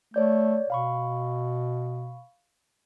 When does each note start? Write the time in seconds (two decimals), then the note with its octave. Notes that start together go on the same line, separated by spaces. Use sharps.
0.14 A3 C#5 D5 G6
0.70 B2 F5 B5 C#6